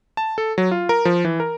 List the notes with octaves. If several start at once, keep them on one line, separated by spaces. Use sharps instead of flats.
A5
A4
F#3
F4
A#4
F3
E3
A#4